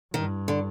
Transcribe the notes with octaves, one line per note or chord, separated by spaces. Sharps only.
G2 D#3
D3